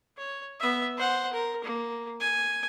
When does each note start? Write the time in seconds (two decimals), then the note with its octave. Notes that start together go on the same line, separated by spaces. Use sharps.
0.18 C#5
0.60 B3 E5
0.97 C5 F#5
1.33 A#4
1.64 A#3
2.21 G#5